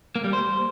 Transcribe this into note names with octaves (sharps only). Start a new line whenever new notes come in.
A#3
G3
C5